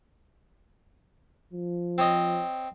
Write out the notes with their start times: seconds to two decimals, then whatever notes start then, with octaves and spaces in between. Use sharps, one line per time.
1.54 F3
1.98 C4 C#5 D#5